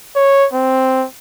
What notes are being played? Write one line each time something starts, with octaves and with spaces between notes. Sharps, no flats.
C#5
C4